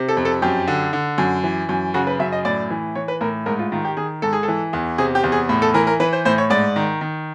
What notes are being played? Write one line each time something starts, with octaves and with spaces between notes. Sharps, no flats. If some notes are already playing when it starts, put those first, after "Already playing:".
Already playing: C3
A4
F2
A4
F#2 G4
D3
D3
F#2
E3
F#2
C#3 F#4
B4
F#2 E5
D#5
A2 D5
E3
E3 C#5
B4
A2 A#4
G#2 A#4
F4
D#3 F4
G4
D#3 G#4
G#2 A4
G#4
E3 A4
E2
C3 G#4
G4
E2
G#4
A2
A4
E3 A#4
A#4
E3 B4
C5
A2 C5
C#5
G#2 D5
D#3
D#3